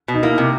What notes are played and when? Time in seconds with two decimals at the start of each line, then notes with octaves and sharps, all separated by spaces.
0.08 B2
0.14 D#4
0.23 A#3 E4
0.38 C3